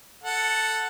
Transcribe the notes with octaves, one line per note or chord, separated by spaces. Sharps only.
A4 F#5